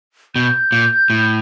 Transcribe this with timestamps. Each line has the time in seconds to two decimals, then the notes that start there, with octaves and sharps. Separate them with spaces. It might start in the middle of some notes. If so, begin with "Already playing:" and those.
0.35 B2 G6
0.72 A#2
1.10 A2